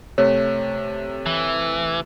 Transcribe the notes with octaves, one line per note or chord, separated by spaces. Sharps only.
C3 A3 C#5
E3